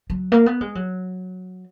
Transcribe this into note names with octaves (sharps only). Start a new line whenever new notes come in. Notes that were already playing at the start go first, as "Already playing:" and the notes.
F#3
A#3
B3
G#3
F#3